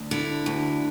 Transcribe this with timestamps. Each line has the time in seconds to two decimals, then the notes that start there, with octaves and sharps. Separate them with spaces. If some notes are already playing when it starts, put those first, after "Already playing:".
Already playing: D2
0.11 D3 E4
0.46 D2